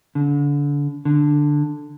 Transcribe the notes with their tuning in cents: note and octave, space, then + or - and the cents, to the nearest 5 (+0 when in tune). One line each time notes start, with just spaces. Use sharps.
D3 -30
D3 +5